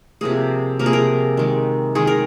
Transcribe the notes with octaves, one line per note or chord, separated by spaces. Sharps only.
C3 F3 A#3 G#4
C3 F3 A#3 A#4
G#4
A#4
D#3 G#3
D#3 G#3 G#4
A#4